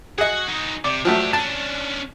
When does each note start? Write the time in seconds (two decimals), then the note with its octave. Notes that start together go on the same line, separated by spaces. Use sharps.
0.18 F#4 G#4 D#5 F#5
0.48 D#4 F#4
0.84 C3 D5
1.05 F3 F#3 A3 D4 G4
1.33 C#4 D4 A5